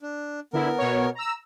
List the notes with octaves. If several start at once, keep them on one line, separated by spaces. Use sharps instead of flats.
D4
D3 B3 E4 A#4
B2 C#5
A#5 E6